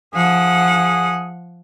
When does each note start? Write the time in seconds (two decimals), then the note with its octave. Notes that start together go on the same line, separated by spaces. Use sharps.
0.14 F3 G#4 F#5